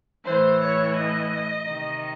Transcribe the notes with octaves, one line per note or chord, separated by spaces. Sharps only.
A2 E3 C5
C#5
D#5
C3 D#3